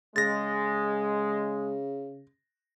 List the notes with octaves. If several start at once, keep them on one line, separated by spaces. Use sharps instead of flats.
C#3 G#3 A6 A#6